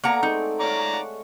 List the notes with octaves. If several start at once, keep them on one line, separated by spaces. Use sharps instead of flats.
A#3 B3 A4 D5 F#5 A#5
G#3 A3 C4 D#4
C#5 D5 F5 A#5 D6
F#5